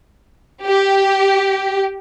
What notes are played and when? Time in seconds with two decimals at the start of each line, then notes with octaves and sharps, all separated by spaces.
0.64 G4